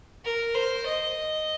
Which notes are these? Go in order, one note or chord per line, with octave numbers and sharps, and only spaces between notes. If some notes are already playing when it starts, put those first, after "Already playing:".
A#4
C5
D#5